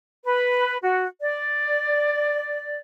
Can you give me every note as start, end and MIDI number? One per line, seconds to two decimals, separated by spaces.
0.25 0.77 71
0.82 1.06 66
1.21 2.79 74